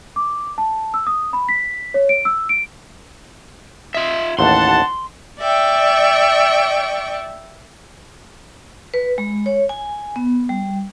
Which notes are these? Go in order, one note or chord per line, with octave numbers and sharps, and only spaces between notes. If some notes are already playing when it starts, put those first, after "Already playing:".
D6
A5
E6
D#6
B5
B6
C#5
D7
E6
D7
F4 D#5 E5
A1 D#2 F#5 A5 C6
D5 E5 G5 C#6
B4
G#3
C#5
G#5
B3
G3